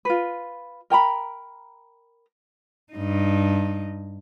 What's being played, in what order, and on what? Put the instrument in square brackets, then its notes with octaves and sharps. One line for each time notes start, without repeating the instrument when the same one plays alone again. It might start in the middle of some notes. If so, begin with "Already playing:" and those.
[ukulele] F4 B4
A#4 G5 A#5 B5
[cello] G2 D#4